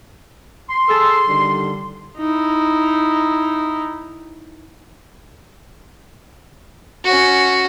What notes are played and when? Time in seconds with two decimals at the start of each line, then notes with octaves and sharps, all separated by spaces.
0.70 C6
0.89 G#4 A4
1.28 D3 D#3 G3
2.17 D#4 E4
7.04 C#4 F#4